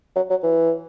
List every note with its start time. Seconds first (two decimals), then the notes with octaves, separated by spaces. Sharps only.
0.16 F#3
0.30 F#3
0.43 E3